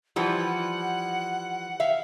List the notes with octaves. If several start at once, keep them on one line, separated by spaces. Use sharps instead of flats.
E3 F3 G3 F#5
E5 F5